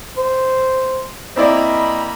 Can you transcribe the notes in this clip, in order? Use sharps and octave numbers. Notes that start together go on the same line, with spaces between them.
C5
A#3 C4 E4 D5 D#5 B5